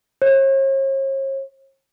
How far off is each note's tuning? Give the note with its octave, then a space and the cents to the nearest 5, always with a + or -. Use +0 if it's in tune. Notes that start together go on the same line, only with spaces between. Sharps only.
C#5 -45